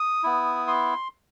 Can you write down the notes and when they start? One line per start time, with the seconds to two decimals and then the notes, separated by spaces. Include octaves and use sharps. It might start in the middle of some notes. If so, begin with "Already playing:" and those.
Already playing: D#6
0.24 B3 E4
0.68 C6